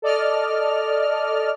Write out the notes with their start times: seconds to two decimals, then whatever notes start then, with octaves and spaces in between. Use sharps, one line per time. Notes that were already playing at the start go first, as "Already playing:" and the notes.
0.02 A4 D5 D#5 F6